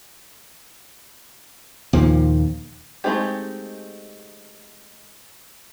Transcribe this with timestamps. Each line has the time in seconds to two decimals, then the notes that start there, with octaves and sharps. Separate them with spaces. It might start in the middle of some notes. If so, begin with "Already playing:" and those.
1.93 D#2 A#2 F3
3.04 G#3 A3 C4 D#4 G4